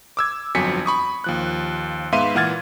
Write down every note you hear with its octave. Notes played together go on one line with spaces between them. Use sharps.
D6 E6 G#6
G1 F2 F#3 G#5 B6 C#7
B5 C#6 D#6
D#2 F3 F#6
G#2 B3 E5 F5 C6 D#7
A#2 E3 F#5 F6 G#6 A6